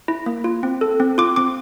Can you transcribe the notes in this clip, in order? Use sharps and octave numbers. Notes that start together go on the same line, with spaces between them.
E4
A#3
F4
C4
A4
C4
F4 D6
C4 D6